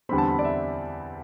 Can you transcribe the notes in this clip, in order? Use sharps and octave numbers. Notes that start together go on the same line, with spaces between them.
E2 D3 G3 C4 B5
A5
B5
D5
E5